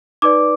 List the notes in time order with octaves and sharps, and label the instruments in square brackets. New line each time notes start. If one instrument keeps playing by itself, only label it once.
[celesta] D#4 B4 D5 D6